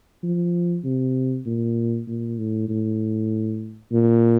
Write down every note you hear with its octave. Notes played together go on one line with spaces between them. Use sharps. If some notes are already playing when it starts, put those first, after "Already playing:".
F3
C3
A#2
A#2
A2
A2
A#2